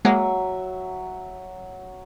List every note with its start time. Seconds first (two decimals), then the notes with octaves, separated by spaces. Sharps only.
0.05 F#3 G#3 A#3 E5